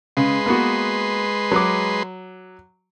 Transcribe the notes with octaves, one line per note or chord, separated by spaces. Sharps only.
C#3 G#3 B4 C6
A#3 B3 F#4
F#3 D6